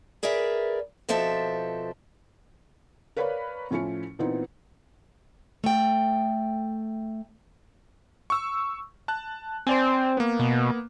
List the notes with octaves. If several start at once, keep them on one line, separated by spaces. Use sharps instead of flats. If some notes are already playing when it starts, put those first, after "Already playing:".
G#4 A#4 B4 D5 E5
B2 F3 C4 A4 E5
A#4 B4 C#5 D5 F5 B5
A2 F3 C#4 E4 C#7
A#2 E3 B3 C4 D#4
A3 G5
C#6 E6
A5 F#6
C4 C5 D5 G#5
A#3 B3
B2